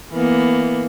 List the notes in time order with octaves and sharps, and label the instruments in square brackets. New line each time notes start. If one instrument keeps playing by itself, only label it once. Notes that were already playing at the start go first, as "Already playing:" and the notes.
[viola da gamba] E3 A#3 B3